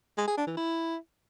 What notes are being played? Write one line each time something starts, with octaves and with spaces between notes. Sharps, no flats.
G#3
G#4
D4
E3
E4